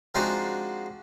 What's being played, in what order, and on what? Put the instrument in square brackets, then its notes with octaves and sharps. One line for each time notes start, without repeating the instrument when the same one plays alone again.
[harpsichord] F3 G#3 C4 D4 D#4 F#4